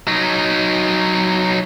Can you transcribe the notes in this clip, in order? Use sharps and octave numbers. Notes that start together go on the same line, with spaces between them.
F#3 D#4